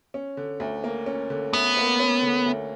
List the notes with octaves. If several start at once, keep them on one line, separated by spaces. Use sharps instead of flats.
C#4
D3
D2
A#3
C#4
D3
D2 B3
A#3
C#4
D3
D2